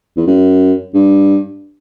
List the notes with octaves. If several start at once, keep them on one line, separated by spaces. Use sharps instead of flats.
E2
F#2
G2